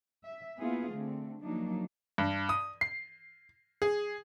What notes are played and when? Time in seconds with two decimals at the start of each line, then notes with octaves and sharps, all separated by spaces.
0.25 E5
0.57 A#3 B3 E4 F4 G#4
0.91 D3 A3 C4
1.41 F3 F#3 A#3 D4 D#4
2.18 G2
2.49 D#6
2.81 C7
3.82 G#4